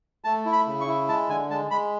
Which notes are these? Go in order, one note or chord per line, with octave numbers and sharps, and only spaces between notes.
A3 A5
E4
B5
C#3
C#6
E4
G#3 A5
D3 G#5
G#3 A5
G#3 B5